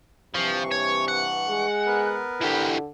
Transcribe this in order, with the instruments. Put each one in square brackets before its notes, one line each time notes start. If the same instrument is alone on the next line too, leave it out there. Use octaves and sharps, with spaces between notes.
[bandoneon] G2 E3 C#6 [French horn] C3 [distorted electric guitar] F3
[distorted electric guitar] C#5
F#5
[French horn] G#3
[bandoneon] B3 A#4 B4
[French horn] D3 [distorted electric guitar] E3 G4